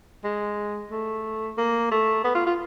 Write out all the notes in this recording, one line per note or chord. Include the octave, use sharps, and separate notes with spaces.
G#3
A3
A#3
A3
B3
F4
F4